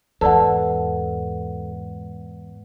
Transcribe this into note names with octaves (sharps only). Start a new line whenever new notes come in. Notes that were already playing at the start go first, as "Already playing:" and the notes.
E2 G#2 A4 B4 D5 F#5